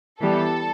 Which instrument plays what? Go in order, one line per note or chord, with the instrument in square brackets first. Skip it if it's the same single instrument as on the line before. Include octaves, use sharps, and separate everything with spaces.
[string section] E3 G3 B3 A4